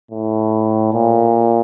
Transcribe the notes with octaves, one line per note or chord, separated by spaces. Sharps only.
A2
A#2